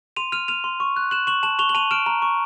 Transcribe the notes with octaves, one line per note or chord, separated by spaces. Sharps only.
C6 D#7 F7
F6 D#7 F7
F6 D#7 F7
C6
C#6
F#6
F#6 E7 F#7
C#6 E7 F#7
A5 E7 F#7
C#6 F7 G7
F#7
A5 D#7 F7
F6 D7 E7
A#5
C#6